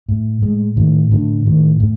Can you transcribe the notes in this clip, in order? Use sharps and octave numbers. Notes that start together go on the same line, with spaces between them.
A2
A2 G#3
A2 D#3
A2 D3
A2 D#3
A2